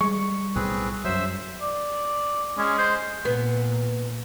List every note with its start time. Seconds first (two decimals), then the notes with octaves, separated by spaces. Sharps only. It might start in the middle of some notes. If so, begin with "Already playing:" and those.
0.01 G3 G#3 C#6
0.56 B1 A2 C4 G#4 B4
1.04 F#2 F#3 C5 E5
1.61 D5
2.58 G#3 C#4
2.78 C5
3.25 A#2 B3